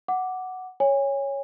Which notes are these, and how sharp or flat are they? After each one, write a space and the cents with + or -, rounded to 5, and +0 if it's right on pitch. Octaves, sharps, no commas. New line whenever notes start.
F#5 +5 D6 +0
C#5 +0 G#5 -35